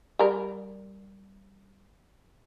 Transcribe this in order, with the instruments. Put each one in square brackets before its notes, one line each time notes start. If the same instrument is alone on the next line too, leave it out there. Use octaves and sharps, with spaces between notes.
[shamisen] G3 A#4